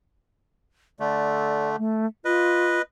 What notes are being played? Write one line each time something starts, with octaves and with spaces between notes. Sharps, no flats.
D3 A3 D5
A3
F4 B4 D#5